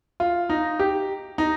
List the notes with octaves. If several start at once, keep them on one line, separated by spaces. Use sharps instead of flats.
F4
D#4
G4
D#4